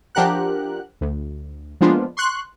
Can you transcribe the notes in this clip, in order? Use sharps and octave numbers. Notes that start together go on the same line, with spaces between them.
F3 D4 G4 A#4 F#5 F#6
D2
F3 G#3 A#3 B3 D4 F4
C6 C#6 F#6